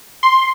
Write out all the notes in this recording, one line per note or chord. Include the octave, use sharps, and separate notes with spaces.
C6